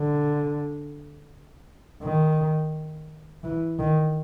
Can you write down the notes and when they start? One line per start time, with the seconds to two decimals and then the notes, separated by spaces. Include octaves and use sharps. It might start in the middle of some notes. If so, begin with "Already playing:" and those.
Already playing: D3
2.03 D#3
3.44 E3
3.79 D#3